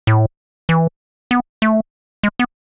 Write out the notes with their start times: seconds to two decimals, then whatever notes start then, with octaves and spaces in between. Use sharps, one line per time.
0.07 A2
0.69 E3
1.31 B3
1.62 A3
2.23 G#3
2.39 B3